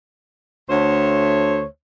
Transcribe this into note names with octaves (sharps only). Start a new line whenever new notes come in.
D2 A3 C5 C#5